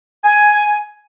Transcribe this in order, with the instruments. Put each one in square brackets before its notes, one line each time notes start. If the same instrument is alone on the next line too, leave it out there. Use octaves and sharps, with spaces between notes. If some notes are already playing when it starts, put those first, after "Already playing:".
[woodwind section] G#5